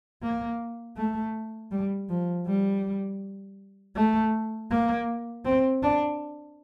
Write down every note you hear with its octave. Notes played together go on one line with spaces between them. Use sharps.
A#3
A3
G3
F3
G3
A3
A#3
C4
D4